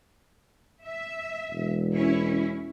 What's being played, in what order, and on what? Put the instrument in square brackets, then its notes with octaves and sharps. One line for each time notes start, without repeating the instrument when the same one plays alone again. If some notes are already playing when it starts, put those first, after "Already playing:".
[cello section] E5
[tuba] E1
[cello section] C#4 E4